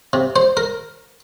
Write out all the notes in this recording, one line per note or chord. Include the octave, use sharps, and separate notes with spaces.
C3
C5
A#4